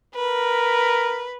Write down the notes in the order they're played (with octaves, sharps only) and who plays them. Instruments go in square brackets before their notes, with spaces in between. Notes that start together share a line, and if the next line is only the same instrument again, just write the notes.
[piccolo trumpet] A#4 [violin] B4